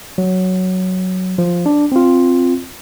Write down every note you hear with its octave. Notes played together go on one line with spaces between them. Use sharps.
F#3
F3
D4
C4 F4